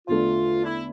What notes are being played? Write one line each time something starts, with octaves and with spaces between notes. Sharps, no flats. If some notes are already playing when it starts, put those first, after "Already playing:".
E2 D3 A3 F4
D4
E4